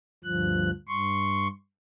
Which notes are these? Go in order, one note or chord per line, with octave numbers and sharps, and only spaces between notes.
D2 G2 F3 F#6
G2 C6 C#6